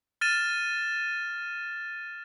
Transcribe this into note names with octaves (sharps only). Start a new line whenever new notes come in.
F6 A6 D#7 E7